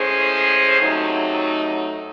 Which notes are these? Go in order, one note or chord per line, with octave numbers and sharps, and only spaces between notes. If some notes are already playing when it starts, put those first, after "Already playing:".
Already playing: A2 G#3 C#4 G#4 C5
C3 F#3 A3 D#4